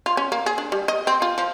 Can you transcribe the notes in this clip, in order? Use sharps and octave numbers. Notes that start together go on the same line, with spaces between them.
F4
C#4
A#3
G#4
D4
G3
D#5
C4
F4
F3